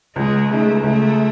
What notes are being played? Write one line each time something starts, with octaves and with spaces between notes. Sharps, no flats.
C#2 G#3
C#3 G#3 A3 D#4
C#2 A3